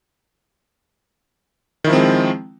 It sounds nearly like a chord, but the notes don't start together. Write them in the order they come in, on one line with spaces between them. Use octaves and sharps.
D#3 E4 F3 C4 G#3